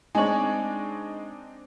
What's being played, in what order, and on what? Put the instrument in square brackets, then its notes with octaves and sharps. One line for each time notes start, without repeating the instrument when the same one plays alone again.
[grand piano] G#3 C#5 [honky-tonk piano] C4 D4 D#4 [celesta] G#5 F#7